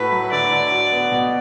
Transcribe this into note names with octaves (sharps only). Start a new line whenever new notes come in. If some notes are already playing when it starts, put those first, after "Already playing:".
Already playing: A2 A3 F#4 B4
F#3
D3 D5
D3
F#4
B3
B2